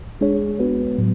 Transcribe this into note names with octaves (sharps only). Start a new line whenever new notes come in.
G#3 D4 G#4 C#5
G#3 B3 F#4 B4
A2 F#3